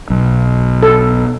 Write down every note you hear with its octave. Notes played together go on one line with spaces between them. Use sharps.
B1
A4